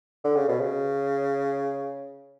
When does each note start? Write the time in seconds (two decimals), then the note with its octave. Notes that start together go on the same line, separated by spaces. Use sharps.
0.24 D3
0.36 C#3
0.48 B2
0.60 C#3